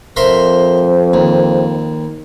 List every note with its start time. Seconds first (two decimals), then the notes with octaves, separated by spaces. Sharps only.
0.16 F2 A#4 C5 E5 C6
1.14 D#2